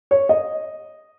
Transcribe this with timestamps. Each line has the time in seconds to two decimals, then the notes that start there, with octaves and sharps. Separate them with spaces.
0.11 C#5
0.29 D#5